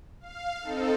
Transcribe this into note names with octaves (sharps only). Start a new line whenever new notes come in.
F5
C4 D#4 A4